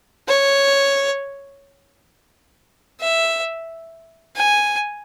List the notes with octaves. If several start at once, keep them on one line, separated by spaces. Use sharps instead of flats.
C#5
E5
G#5